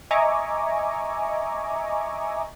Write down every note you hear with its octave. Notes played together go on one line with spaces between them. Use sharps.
D#5 E5 G#5 A#5 C#6 D6